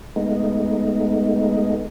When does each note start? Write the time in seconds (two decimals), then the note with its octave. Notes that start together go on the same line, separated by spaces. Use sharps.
0.16 G#3 A3 B3 D#4